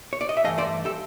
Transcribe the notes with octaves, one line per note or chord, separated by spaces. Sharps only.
C#5
D5
D#5
E5
G2 E3 A3 D#5 F5
C5 D5
G4 A4